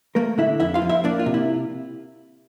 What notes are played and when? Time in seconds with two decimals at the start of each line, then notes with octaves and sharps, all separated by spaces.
0.15 A3 A#3 A#4
0.38 D3 E4 E5
0.60 F2 E4 E5
0.74 F4 F5
0.82 F3
0.89 E4 E5
1.04 A#3 D4 D5
1.19 F4
1.26 C3
1.34 E4